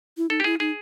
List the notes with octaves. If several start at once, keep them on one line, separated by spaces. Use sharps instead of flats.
E4
D#4 A4
G4
E4 G#4
D#4 G#4